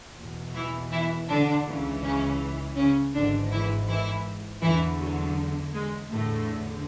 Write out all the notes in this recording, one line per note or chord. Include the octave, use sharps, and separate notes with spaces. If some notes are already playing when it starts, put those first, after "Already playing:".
E2 B2
E3 E4
E3 E4
D3 D4
C#2 C#3 E3
C#3 C#4
C#3 C#4
G#1 G#2 D3 E3 D4
E3 E4
E3 E4
E2 D3 E3 E4
F#3
G#3
E2 A2 D3 A3